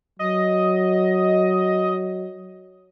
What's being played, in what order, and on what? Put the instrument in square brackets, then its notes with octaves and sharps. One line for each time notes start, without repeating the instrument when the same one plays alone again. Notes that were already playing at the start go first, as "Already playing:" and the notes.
[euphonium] F#3 [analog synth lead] D#5